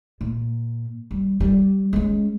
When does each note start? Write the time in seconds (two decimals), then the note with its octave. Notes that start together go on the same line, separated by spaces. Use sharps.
0.21 A#2
1.11 G3
1.40 G3
1.93 G#3 C#4